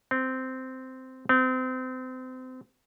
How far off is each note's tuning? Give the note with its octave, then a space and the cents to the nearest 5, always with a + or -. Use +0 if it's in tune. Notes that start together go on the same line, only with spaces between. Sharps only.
C4 -10
C4 -30